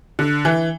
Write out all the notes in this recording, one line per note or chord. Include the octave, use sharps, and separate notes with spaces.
D3
E3